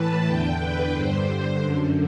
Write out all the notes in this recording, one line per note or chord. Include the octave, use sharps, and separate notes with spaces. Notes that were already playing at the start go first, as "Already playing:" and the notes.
Already playing: A2 E3 B4 A5
E2 D3 G5
B4
G2 D3 C5
F#2 D3